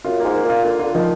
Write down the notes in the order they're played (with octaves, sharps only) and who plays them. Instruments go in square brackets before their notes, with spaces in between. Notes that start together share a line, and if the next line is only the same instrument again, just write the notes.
[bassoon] F#2 [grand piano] F4
[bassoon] G#2 [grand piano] A#3
[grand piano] A#3
[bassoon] A#2
[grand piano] F4
[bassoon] D3 [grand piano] A#3
[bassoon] D3 [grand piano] F4
[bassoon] D#3 [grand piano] F3